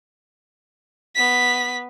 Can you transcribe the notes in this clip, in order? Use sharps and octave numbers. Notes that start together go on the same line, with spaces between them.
B3 B6